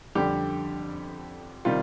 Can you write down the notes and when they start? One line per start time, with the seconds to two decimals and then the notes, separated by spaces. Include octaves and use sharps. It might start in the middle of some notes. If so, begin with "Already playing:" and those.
0.15 F2 D3 G3 G4
1.65 C3 D#3 G3 F4